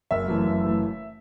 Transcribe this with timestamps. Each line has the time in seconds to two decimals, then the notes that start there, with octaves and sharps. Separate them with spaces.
0.11 F#1 E5
0.28 F#2 E3 A3
0.45 F#1
0.64 E3 A3